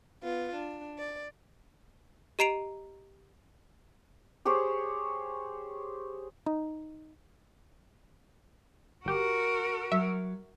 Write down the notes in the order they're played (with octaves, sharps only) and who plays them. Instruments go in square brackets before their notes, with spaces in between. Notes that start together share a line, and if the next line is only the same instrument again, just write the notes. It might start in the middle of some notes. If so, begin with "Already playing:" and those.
[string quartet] B3 F4
D4
D5
[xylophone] G4 D#5 A#5 C7 D7 F7
[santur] G4 G#4 C5 C#5
[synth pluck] D#4
[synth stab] G1 G4 [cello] F#4 A#4
[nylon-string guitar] F#3 [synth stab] E5